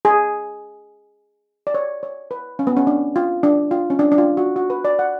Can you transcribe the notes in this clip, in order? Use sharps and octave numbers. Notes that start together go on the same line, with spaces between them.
G#4
D5
C#5
C#5
B4
C#4
B3
C#4
D4
F4
D4
F4
C#4
D4
D4
F4
F#4
F#4
B4
D5
F#5